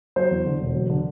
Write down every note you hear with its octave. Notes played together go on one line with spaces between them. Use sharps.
F#3 C5
E2
D3
E1
F#3
D3